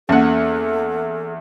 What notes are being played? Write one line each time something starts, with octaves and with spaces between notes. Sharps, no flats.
E2 A#3 C#4 A4 F#5